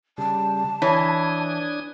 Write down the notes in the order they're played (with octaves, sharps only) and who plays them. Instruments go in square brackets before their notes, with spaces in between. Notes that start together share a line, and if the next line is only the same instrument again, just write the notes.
[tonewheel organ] C#3 G3 [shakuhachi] A5
[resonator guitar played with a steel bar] E3 [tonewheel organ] D4 G#5 D#6 [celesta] C#5